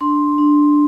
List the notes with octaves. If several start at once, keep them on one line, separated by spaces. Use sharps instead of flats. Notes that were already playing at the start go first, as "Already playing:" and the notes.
D4 C6
D4